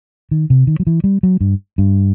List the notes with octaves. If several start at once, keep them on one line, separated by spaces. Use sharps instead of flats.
D#3
C3
D#3
F#3
E3
G3
F#3
G2
G2